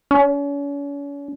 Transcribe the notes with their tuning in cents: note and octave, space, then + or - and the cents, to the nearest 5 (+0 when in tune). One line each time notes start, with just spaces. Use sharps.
C#4 +40